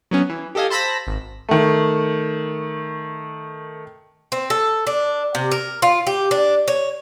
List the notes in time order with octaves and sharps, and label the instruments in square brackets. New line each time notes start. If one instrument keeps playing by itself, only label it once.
[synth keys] F#3 B3 C#4
E3
G4 A4 D#5 F5 G#5
C5 A5 B5 E6 A#6 B6
G#1
[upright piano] D#3 A3
[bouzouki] C4
A4
D4
C3
A#4
F4
G4
D4
C#5